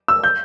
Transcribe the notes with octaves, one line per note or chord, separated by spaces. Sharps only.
E6
G6